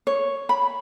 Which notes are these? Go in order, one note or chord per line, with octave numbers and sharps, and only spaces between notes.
C#5
B5